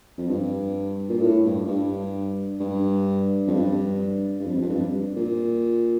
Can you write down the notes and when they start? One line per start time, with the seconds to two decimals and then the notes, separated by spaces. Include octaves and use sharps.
0.18 F2
0.28 G2
1.09 A#2
1.21 A2
1.44 G2
1.67 G2
2.60 G2
3.47 F2
3.53 G2
4.40 G2
4.46 F2
4.62 F2
4.69 G2
5.16 A#2